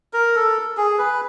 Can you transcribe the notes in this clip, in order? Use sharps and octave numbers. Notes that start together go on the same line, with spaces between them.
A#4
A4
G#4
B4